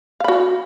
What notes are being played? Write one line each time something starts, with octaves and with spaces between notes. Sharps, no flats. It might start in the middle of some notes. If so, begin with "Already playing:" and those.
F#4 F5 B5